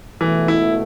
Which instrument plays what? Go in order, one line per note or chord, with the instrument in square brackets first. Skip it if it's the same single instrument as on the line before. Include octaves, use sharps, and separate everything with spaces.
[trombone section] C#2 B2 A3 [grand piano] E3
[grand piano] E4